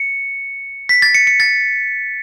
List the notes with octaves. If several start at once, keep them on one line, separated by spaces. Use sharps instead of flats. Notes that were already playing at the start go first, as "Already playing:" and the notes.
Already playing: C#7
B6
A6
C#7
C#7
A6